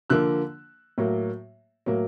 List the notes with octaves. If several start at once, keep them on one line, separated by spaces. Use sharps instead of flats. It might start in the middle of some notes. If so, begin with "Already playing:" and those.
D3 F3 A#3 E6 F#6
A2 F#3 A#3
A2 F#3 A#3